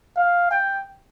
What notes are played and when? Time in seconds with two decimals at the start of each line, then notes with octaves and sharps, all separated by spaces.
0.16 F5
0.51 G5